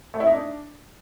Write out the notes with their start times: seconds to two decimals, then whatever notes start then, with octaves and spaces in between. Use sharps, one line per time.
0.14 A3
0.20 E4
0.27 D#4
0.33 D4